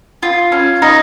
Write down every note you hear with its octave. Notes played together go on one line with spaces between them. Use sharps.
F4
C#4
D#4